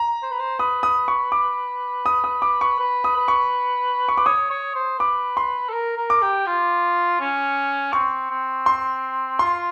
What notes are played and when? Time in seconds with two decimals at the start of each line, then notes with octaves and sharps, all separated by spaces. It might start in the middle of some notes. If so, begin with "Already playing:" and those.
Already playing: A#5
0.22 C5
0.31 B4
0.39 C5
0.59 B4 D#6
0.83 D#6
1.08 C#6
1.32 D6
2.06 D#6
2.24 D#6
2.42 D6
2.61 C#6
2.79 B4
3.04 D#6
3.16 B4
3.28 C#6
4.09 C#6
4.18 D6
4.26 C#5 D#6
4.50 C#5
4.75 C5
4.99 B4 D6
5.37 C6
5.69 A4
5.73 A#4
5.97 A#4
6.10 D6
6.22 G4
6.46 F4
7.20 C#4
7.93 C4 C#6
8.30 C4
8.66 C6
9.39 F4 C6